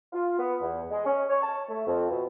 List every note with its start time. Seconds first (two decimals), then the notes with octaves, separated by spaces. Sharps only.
0.13 F4
0.38 B3
0.61 E2
0.91 G#3
1.05 C#4
1.30 C#5
1.42 A5
1.69 A3
1.86 F2
2.10 B2